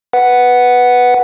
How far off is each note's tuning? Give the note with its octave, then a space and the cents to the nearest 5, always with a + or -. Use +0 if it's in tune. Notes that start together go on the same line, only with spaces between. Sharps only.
B4 +0 F#5 +0